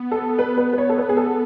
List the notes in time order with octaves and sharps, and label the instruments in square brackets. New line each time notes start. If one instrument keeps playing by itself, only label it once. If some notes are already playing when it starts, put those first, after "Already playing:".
Already playing: [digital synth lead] B3
[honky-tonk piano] A4
B4
B4
B4
C#5
A4
B4
G#4
A4